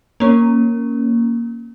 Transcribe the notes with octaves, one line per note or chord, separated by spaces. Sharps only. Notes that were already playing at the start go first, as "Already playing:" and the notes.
A#3 C#4